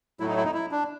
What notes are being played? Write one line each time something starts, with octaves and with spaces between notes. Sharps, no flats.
A2 F#3 A3 E4
D#4
E4
D#4
E4
D4